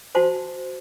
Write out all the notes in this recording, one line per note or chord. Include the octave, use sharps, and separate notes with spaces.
F#4 C5 A5 C6